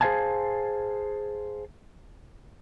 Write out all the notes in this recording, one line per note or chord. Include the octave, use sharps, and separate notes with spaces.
G#4 C5 D#5 F5 G#5 A5